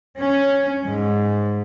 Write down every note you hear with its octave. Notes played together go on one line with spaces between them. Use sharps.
C#4
G#2